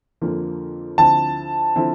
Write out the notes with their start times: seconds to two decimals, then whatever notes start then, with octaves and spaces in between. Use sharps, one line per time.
0.21 F2 D3 F3 A#3
0.98 D2 D3 F3 C4 E4 A5
1.76 D3 F3 C4 E4